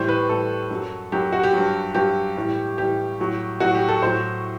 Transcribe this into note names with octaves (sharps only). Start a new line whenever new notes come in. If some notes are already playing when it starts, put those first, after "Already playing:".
Already playing: A2 E3 G3 C5
B4
A2 E3 G3 A4
F#2 F#3
F#2 F#3 G4
F#4
G4
G2 F#3
G2 F#3 G4
A2 E3 G3
A2 E3 G3 G4
A2 F#3
A2 F#3 F#4
G4
A4
A2 F#3 C5